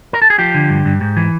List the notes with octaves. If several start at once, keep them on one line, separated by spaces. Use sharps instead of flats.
A#4
A4
G#4
F3 G4
D3
G2
G2
G#2
E3